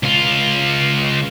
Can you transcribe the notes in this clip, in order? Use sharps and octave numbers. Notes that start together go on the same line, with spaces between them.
C#2 F4